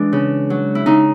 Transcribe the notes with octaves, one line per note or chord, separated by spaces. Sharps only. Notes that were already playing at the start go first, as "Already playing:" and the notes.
Already playing: E3 G#3 D4
C#3
F#3
E4
C#3 D#4